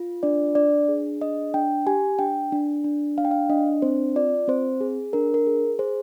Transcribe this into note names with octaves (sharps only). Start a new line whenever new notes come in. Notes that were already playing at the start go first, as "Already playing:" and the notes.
Already playing: F4
D4 D5
D4 D5
G#4
D4 D#5
D4 G5
G4 G#5
D4 G5
D4
D4
D4 F5
G5
F5
D4 D#5
C4 C5
F4 D5
C4 C5
G#4
D4 A#4
A#4
G#4
G#4 C5